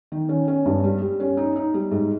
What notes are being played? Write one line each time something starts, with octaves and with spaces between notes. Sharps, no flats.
D#3
C#4
C#4
G2
G3
G3
C#4
D#4
D#4
G3
G#2